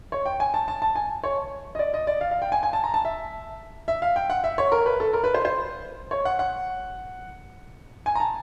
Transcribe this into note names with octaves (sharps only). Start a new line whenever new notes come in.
C#5
G5
G#5
A5
A5
A5
G#5
C#5
D#5
D5
D#5
D5
F5
F5
G5
G#5
G#5
A5
A#5
A5
E5
E5
F5
G5
F#5
E5
C#5
A#4
B4
A4
A#4
B4
C5
C5
C#5
F#5
F#5
G#5
A#5
A5